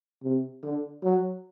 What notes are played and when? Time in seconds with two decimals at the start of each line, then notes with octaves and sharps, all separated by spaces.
0.23 C3
0.63 D3
1.03 F#3